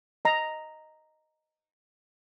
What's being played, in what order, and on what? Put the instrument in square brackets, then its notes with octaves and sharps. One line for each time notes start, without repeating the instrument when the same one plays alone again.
[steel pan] D#5 A#5